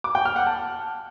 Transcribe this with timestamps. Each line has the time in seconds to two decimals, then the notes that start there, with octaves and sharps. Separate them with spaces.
0.04 D6
0.15 G5
0.25 F6
0.36 F#5
0.47 A5